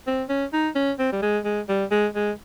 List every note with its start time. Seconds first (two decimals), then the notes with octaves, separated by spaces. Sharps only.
0.07 C4
0.29 C#4
0.53 D#4
0.75 C#4
0.99 C4
1.12 G3
1.22 G#3
1.45 G#3
1.69 G3
1.91 G#3
2.15 G#3